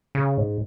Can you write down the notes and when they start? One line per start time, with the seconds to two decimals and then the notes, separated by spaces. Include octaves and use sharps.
0.15 C#3
0.37 G#2